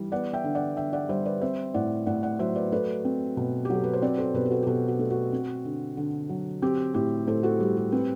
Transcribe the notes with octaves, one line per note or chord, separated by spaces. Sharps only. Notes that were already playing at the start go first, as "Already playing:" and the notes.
Already playing: E3 G3
B3 D5 F#5
E5 G5
D3
D5 F#5
D3 E5 G5
D5 F#5
G3 C5 E5
B4 D5
C4 C5 E5
A2 D5 F#5
A2 D5 F#5
D5 F#5
F#3 C5 E5
B4 D5
A3 B4 D5
C4
B2
G4
F#3 A4
B4
C5
C4 B4 D5
A4 C5
B2 G4 B4
B4
F#4 A4
G4
B2 F#4 A4
F#4
A3
F#4
C4
D3
D3
F#3
C4 G4
A2 G4
A2 A4 C5
F#4 A4
G3 G4
G4
C4 G4 B4